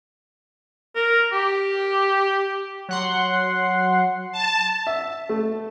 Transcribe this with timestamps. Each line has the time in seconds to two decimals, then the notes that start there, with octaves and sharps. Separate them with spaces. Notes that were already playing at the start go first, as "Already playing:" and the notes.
0.96 A#4
1.33 G4
2.89 F#3 F#5 C6
4.32 A5
4.87 E5
5.29 A3